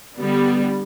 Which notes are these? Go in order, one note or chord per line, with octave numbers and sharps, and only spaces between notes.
D3 G3 B3